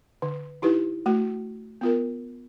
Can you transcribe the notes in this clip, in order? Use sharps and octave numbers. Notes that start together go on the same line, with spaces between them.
D3
D#4 E4 G4 B4
A3 F#4
B3 F4 A#4